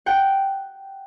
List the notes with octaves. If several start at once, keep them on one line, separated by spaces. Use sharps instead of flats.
F#5 G5